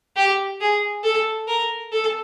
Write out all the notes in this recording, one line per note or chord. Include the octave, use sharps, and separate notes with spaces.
G4
G#4
A4
A#4
A4